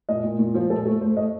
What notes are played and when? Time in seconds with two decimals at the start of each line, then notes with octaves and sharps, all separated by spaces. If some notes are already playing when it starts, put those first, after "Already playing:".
0.09 A#2 D#5
0.24 A#2
0.39 A#2
0.54 F3 C5
0.70 A#2 A4
0.86 A3 A4
1.01 A3 C5
1.16 A3 D#5